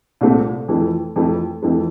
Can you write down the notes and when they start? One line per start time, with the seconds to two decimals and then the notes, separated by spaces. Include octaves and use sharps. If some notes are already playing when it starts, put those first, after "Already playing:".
0.21 C2 A#2 A3 C4
0.68 F2 E3 A3
1.16 F2 E3 A3
1.63 F2 E3 A3